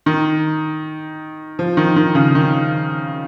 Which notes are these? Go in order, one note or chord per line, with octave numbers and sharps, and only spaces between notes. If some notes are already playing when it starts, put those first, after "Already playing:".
D#3
F3
D#3
D#3
C#3
D#3